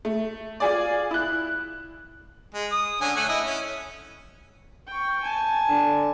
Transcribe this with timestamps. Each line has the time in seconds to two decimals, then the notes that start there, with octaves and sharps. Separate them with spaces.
0.05 A3
0.60 F4 G#4 D5
1.11 E4 F#6
2.54 G#3
2.72 D#6
3.01 D3 C#4 G#5
3.16 A3 F#5 G#5
3.29 E4 D#5 D#6
3.45 C#4
4.87 G5 C#6
5.23 G#5 A5
5.69 D3